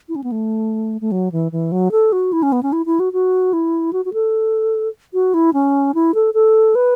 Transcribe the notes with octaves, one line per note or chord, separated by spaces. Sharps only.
E4
C#4
B3
A3
A3
F#3
E3
E3
F#3
A4
F#4
E4
C#4
B3
C#4
E4
E4
F#4
F#4
E4
F#4
F#4
A4
F#4
E4
C#4
E4
A4
A4
B4